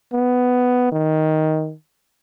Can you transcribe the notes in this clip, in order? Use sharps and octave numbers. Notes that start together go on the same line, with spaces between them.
B3
D#3